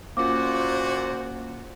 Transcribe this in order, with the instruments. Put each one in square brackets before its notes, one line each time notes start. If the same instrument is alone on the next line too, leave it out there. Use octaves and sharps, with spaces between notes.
[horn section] A#2 F#4 [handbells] A#3 C#4 F4 [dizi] C5 [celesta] D6